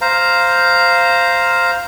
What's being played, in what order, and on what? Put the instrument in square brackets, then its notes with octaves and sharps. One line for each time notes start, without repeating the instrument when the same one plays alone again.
[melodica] C5 F5 A#5